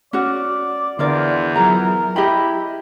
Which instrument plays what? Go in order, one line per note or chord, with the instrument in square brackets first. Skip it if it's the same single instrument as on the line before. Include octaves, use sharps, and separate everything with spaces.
[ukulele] C#4 F#4 [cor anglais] D5
[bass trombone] E2 [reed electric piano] D3 [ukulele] D4 A#4 D5 [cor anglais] F4
[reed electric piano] F#3 F4 G#4 [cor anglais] A#4 [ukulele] A#5
[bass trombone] E4 [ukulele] G4 D#5 B5 [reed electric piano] G5